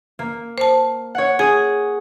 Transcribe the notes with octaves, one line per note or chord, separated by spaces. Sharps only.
A#3
C5 A5
C#5 F#5
G#4 G#5